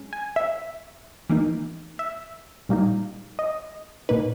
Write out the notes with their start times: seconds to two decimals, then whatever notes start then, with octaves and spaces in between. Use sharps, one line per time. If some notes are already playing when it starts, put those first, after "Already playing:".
Already playing: G#3 C#4
0.13 G#5
0.36 E5
1.30 E3 A#3 D#4
1.99 E5
2.69 A#2 G3 A#3 D#4
3.39 D#5
4.09 A#2 A#3 D#4 B4